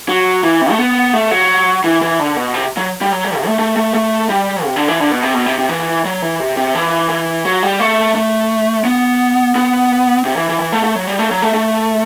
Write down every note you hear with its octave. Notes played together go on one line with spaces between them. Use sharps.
F#3
E3
C3
A3
B3
A3
F#3
E3
E3
D3
B2
C3
F#3
G3
F#3
G3
C3
A3
A3
A3
A3
G3
C3
D3
E3
D3
B2
C3
B2
C3
C3
E3
F#3
E3
C3
C3
E3
E3
F#3
G3
A3
A3
B3
B3
C3
E3
E3
E3
A3
A3
F#3
G3
A3
F#3
A3
A3